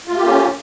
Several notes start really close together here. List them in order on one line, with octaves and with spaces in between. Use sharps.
F4 A3 G4 A#3 C#4